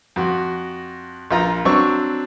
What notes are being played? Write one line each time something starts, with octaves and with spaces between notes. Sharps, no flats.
F2 F#4
A#1 F4 A#5
F#3 C4 D4 C#6 E6